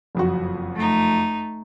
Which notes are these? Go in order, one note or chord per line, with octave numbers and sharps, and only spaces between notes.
F#1 F2 F#4
A3 D#4